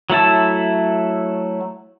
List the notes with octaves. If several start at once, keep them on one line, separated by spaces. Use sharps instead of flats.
F#3 A3 E4 A5